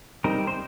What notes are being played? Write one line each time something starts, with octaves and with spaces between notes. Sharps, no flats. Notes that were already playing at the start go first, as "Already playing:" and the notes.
G3 C4 D#4 A#4
C5